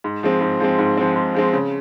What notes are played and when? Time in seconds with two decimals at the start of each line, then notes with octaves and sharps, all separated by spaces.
0.04 G#2
0.23 F3 G#3 C4
0.41 G#2
0.60 F3 G#3 C4
0.79 G#2
0.97 F3 G#3 C4
1.16 G#2
1.34 F3 G#3 C4
1.53 C#3